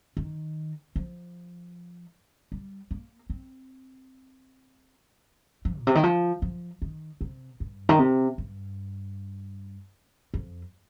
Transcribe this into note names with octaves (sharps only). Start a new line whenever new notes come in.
D#3
F3
G3
A#3
C4
F3
A#2
C3
D#3
F3
F3
D#3
C3
G2
D#3
C3
G2
F2